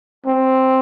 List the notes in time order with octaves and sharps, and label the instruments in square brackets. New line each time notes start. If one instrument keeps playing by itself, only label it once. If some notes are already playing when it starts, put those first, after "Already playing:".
[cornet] C4